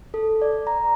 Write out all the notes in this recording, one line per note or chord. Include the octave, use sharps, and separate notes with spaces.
A4
D5
A#5